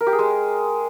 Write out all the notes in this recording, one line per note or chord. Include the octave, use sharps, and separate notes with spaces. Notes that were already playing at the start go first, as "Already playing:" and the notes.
A#4
G4
G#4
G#3